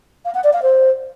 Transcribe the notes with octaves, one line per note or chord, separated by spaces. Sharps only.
F5
F#5
D5
F5
C5